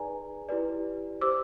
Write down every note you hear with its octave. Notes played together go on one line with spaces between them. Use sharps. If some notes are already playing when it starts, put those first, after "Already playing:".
Already playing: D#4 G#4 B4 D5 G#5 A#5
E4 G4 B4 D5
G4 C5 D6 E6